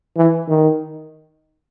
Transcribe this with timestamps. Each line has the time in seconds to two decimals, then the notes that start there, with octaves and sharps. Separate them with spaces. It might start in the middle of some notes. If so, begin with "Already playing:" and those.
0.16 E3
0.49 D#3